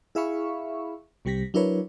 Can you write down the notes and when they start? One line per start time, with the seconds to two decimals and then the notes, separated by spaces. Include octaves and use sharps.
0.15 E4 G#4 E5 F5 B5 C#6
1.25 C2 C3 G3 G4 A#6 B6
1.54 F#3 D4 E4 A#4 B4 C#5